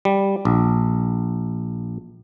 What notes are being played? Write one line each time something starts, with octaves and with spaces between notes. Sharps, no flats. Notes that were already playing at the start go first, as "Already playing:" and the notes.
G3
A#1